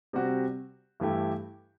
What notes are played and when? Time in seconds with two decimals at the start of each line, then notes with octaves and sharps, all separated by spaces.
0.13 C3 G3 C4 F#4
1.00 G2 E3 A3 E4 G4